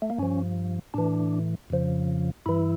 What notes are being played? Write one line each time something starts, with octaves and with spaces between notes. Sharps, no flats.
A3
A#3
G2 F3 C#4
A2 E3 D4
F2 C#3 F3
G2 E3 E4